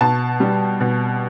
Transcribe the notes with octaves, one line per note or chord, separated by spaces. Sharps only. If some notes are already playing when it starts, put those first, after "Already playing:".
B2 A5
G3
B2